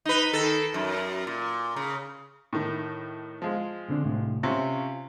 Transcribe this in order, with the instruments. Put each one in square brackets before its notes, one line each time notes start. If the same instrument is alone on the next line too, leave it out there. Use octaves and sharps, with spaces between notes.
[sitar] D#4 B4
D#3 A4
F#2
A#2
C#3
[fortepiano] A2 D#3
F3 G#3
[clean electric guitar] D3 C4 D4
C2 A2
[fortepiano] C3 C#4 [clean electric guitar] F4